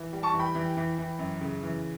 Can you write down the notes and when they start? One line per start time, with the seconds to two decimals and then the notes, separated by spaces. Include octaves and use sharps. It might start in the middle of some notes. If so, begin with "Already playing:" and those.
Already playing: E3
0.13 G3
0.23 A5 C#6
0.34 E3
0.39 G5 B5
0.55 E3
0.77 E3
0.98 E3
1.19 F#2
1.41 C#3
1.63 E3